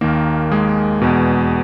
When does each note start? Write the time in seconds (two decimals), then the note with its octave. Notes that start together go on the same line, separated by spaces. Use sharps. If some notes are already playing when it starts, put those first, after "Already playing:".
0.01 D#2 D#3 A#3 A#4
0.52 G#3 G#4
1.02 E2 B2